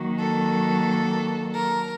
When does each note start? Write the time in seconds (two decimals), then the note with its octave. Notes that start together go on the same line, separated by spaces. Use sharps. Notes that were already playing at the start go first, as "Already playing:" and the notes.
Already playing: D#3 F#3 A#3
0.20 A4
1.55 A#4